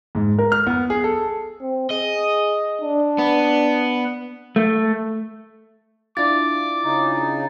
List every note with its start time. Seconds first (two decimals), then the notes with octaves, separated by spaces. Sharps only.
0.15 G#2
0.38 A#4
0.52 F6
0.67 B3
0.90 G#4
1.04 A4
1.61 C4
1.90 G#4 D#5
2.81 D4
3.18 B3
4.56 A3
6.17 D4 E4 F4 D6 A6
6.84 C#3 D#4